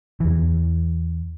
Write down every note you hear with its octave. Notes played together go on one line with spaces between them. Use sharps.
E2 E3